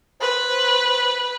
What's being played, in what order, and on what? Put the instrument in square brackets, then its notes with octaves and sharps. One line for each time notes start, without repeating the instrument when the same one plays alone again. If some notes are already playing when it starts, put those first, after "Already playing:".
[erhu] B4 [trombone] C5